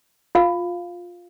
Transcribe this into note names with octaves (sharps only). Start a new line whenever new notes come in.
F4 F5